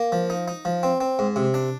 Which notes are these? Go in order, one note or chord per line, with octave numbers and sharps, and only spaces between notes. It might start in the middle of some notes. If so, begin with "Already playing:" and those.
Already playing: A#3
F3
D#4
D#4
F3
C4
C4
G#2
C3
D4